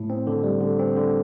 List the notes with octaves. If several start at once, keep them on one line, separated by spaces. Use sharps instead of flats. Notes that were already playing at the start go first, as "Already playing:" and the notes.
Already playing: A2
C4
D3
G3
D3
C4
D3